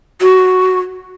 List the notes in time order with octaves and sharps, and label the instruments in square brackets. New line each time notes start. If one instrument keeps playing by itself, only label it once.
[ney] F#4